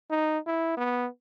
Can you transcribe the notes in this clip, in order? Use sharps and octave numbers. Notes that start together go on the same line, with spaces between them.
D#4
E4
B3